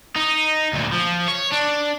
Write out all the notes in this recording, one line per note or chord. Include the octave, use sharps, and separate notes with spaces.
D#4
D2 A#2
F3
C#5
D4